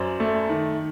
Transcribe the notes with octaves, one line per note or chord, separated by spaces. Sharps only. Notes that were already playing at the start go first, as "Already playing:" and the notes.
Already playing: F#2 C5 D5
A3
D#3